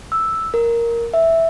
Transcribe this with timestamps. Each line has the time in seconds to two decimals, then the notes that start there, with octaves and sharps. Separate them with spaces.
0.12 E6
0.54 A#4
1.14 E5